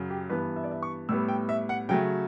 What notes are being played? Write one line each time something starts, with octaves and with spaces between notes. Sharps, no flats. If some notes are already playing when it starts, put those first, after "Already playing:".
Already playing: F#2 C#3 F#3
G4
G2 E3 B3 B4
E5
D5
E5
C#6
A2 G3 B3 E6
G5
E5
F#5
C#3 F#3 A3 G5